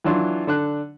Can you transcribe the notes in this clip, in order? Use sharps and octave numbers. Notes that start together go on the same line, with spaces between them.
E3 F#3 D4 F4
D3 D4 F#6